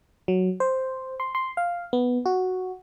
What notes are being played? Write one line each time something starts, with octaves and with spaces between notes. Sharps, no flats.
F#3
C5
C6
C6
F5
B3
F#4